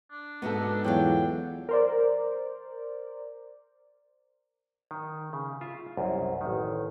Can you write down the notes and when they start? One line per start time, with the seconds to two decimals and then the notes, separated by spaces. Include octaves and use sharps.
0.11 D4
0.42 G#2 B3 F#4 A4 E5
0.84 E2 F#3 F4 F5 G5
1.69 A#4 C5 D5
4.91 D#3
5.33 C#3
5.61 F4 E5
5.97 C2 F#2
6.41 A1 D#3